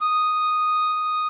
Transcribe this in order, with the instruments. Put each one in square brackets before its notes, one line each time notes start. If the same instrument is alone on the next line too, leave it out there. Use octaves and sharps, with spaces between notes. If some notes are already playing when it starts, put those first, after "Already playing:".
[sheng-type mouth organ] D#6